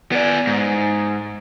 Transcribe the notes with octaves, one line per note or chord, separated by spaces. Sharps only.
B3 D5
G#2